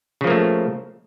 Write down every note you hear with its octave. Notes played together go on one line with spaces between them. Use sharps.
C#3 F3 A3 A#3